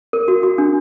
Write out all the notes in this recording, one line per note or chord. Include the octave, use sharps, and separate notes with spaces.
A#4
F#4
F#4
D4